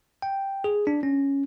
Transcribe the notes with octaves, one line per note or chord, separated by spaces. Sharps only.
G5
G#4
D4
C#4